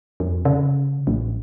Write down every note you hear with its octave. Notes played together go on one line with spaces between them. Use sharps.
F2
C#3
A1